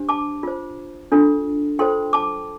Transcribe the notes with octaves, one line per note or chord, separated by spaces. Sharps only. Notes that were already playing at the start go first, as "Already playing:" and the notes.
Already playing: D4 G4 C5
A5 D6
F4 C5
D4 F4 A4
F4 A4 C5 G5 C6
A5 D6